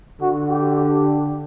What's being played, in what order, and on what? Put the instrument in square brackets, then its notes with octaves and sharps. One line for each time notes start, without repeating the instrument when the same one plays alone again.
[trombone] D3 [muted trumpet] F#4
[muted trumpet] G4